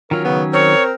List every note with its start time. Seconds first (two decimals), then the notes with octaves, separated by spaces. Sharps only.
0.11 D#3 F#3 C#4 F4 A#4
0.25 C#3 B3
0.53 C4 A#4 C#5